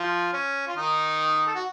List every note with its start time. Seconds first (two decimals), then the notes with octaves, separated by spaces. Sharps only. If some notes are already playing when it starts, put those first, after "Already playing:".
Already playing: F3 F4
0.33 C#4
0.68 F4
0.77 D#3 D#4
1.47 A4
1.55 F#4